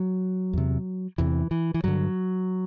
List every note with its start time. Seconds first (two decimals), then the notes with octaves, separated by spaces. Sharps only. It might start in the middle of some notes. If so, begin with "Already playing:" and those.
Already playing: F#3
0.53 E2 C3
1.18 E2 C3 E3
1.51 E3
1.74 E3
1.84 G2 D3 F#3